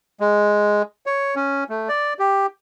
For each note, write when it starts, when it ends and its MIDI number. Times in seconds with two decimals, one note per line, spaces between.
0.20 0.82 56
1.06 1.35 73
1.36 1.64 61
1.69 1.89 57
1.89 2.13 74
2.19 2.46 67